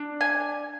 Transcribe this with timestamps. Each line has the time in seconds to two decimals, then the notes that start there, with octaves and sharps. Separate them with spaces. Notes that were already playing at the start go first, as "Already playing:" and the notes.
Already playing: D4
0.21 G#5